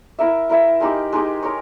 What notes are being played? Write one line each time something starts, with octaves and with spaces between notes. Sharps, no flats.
E4 A#4 E5
E4 A#4 E5
G#3 D#4 G4
G#3 D#4 G4
A#4 C#5